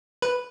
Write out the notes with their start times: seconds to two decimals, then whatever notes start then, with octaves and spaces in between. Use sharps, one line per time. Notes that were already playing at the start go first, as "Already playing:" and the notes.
0.22 B4